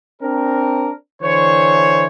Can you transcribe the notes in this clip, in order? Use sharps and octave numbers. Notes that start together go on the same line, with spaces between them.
C4 D4 A#4
D3 E3 C5 C#5